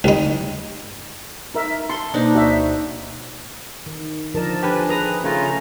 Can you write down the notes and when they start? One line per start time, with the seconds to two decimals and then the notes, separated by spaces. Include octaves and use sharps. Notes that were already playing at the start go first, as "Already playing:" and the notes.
0.04 C2 D#4
1.54 D#4 A#4 E5
1.89 A4 C6
2.14 B2 A#3 D4 D#4 C5
2.35 D2 F#4 C5 E5
3.86 D#3
4.35 D3 F3 A#4 D5 D#5 A5
4.63 D4 G4 B4 G#5
4.89 G#4 B4 A#5 D#6
5.24 C#3 A3 F4 G#5 A#5